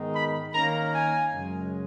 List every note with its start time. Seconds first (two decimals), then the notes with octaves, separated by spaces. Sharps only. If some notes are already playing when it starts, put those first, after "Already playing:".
Already playing: G#2 D#3 G#3 B3 D#4
0.14 B5
0.54 D#3 A#3 C#4 A#5
0.93 G#5
1.32 F#2 C#3 G#3